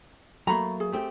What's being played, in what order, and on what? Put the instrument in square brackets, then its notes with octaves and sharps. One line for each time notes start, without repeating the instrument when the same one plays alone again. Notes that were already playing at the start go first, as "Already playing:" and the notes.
[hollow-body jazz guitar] F#3 A3 A#3 [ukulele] A#5 B5
[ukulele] G#4
[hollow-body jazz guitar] A3 C4 G4